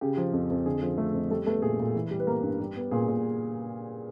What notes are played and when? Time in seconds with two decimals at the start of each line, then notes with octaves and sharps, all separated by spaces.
0.01 C#3 G4
0.17 F3
0.33 F2
0.50 F2
0.66 D3 G#4
0.82 F3
0.98 A3
1.14 F2
1.30 G3 A3 A4
1.46 A3 B3 A4
1.62 A#2 G#4
1.79 A#2
1.95 E3
2.11 G3
2.20 B4
2.27 A#3 B3 A#4
2.43 G2
2.60 G3
2.76 B3
2.91 A#2 G#4
3.08 A#2